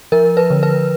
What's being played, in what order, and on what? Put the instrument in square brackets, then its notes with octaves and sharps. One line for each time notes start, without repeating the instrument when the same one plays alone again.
[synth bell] F3 A#4
B4
D3
B4